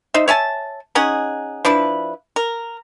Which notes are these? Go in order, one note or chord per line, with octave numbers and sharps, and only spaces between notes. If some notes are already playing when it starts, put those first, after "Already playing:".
D#4 C5 E5
C#5 E5 G#5 A5
C#4 D#4 G#4 F#5
F3 D4 E4 B4
A#4